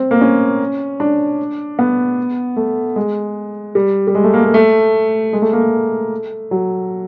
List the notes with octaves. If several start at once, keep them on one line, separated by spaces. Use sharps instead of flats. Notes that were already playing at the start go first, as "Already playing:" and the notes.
Already playing: C4
A#3
C#4
D4
B3
A3
G#3
G3
G3
G#3
A3
A#3
A#3
A3
G#3
A3
A#3
A3
F#3